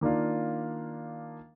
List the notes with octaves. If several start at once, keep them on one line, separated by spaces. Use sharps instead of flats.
D#3 A#3 D4 F4